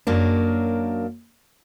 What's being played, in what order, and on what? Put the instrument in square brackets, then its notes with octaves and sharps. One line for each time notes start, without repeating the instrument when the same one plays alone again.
[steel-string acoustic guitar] F#2 F#3 A#3 D4